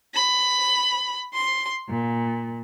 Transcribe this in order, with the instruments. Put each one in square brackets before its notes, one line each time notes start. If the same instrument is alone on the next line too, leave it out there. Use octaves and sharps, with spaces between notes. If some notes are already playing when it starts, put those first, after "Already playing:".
[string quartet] B5
C6
A#2